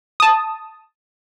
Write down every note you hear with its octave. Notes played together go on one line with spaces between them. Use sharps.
A5 D#6